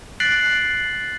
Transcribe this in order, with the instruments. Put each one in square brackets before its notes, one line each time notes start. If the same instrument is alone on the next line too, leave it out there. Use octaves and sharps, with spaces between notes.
[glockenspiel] F#6 A6 B6 C7 D7 F#7